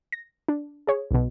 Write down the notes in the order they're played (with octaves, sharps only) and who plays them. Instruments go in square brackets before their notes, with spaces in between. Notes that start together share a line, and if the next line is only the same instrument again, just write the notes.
[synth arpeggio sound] A#6
D4
G#4 C#5
B1 B2